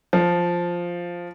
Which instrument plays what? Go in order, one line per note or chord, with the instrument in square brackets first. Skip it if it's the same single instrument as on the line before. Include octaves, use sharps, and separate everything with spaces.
[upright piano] F3